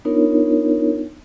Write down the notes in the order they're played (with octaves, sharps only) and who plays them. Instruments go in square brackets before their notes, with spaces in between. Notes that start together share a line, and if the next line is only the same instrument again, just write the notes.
[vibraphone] B3 D4 D#4 F4 A#4 C#5